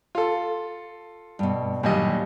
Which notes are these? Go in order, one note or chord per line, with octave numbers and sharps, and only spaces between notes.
F4 A4
G2 B2
D#2 A#2 D3 F#3 G3 D#5